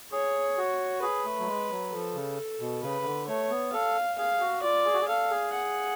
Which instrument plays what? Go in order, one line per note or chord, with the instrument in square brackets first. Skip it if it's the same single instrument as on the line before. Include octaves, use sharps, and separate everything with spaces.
[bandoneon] G#4 [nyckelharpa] C#5
[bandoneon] F#4
[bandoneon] G#4 [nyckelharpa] B4
[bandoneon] A3
F#3
G#3
F#3
[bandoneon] F3 [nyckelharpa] A4
[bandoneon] C#3
B2
[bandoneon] C#3 [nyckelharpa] B4
[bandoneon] D3
[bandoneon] A3 [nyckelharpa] C#5
[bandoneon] B3
[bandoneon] A4 [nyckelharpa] F5
[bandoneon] G#4 [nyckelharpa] F5
[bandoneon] F#4
[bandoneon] F4 [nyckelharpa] D5
[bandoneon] G#4
F#4
G#4
[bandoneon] A4 [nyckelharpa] F5
[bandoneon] G#4
[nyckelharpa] F#5